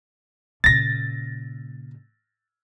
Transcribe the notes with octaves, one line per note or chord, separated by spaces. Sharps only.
A#2 C#3 A6 A#6